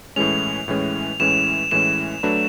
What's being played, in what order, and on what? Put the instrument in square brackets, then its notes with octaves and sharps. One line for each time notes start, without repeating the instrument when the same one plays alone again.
[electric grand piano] A2 E3 G#3 C#4 [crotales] F7
[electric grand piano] A2 E3 G#3 C#4
[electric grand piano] A2 E3 G#3 C#4 [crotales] E7
[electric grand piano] A2 E3 G#3 C#4 [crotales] E7
[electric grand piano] F#3 A3 D4 F#4 B4